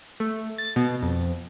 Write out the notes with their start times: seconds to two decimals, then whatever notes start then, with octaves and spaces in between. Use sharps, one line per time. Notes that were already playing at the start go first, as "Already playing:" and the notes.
0.20 A3
0.58 A6
0.76 B2
1.02 F2